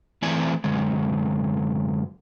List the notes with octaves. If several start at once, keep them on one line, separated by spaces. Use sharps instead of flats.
E3 A3 C4 E4 D5 G#5
F#2 D3 G#3